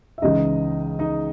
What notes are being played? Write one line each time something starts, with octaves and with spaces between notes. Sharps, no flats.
E5
C#2 C#3 E3 D#4 D#5
D#4 D#5